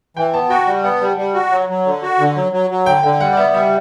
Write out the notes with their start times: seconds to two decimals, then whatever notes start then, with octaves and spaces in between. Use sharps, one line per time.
0.17 E3 G5
0.34 B3 A5
0.50 F#4 G5
0.67 G3
0.83 B3 F#5
1.01 G3
1.17 G3
1.34 F#4
1.51 F#3
1.69 F#3
1.86 D3
2.02 F#4
2.19 D3
2.36 F#3
2.52 F#3
2.70 F#3
2.86 D3 G5
3.03 D3 G5
3.20 G3 F#5
3.33 D5
3.37 B3 E5
3.54 G3 E5